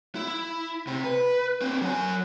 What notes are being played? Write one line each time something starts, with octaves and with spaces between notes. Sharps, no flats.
E4
C3 C4
B4
C4 D4
F#3 G#5